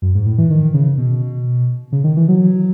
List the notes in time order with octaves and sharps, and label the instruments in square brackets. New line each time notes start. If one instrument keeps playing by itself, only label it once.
[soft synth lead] F#2
G#2
A2
E3
D#3
C#3
B2
C#3
D#3
E3
F#3